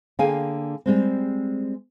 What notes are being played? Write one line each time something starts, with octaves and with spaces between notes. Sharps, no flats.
D3 A#3 G#4 F5 G5 G#5
G3 G#3 C4